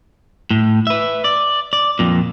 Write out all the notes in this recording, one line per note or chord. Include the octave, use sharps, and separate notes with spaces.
A2
B4 E5
D5
D5
F2 A#2